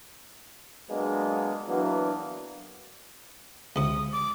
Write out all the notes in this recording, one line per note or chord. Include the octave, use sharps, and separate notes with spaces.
F#3 G#3 A#3 B3 D4
E3 F#3 A#3 B3 D4
C#2 C3 D#6
D6